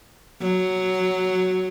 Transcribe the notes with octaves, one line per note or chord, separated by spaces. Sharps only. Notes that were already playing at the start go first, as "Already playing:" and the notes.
F#3